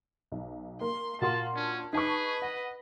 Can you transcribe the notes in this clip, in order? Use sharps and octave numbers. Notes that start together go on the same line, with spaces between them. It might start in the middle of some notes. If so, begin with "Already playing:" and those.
B1
A#3 C6
A#2 A#3 F#4 A5 C6
C#4 D4
D#4 G#4 B4 A5 C#6
D#5 F#5